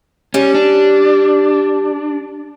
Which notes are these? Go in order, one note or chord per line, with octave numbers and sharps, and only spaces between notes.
G3 C#4
D4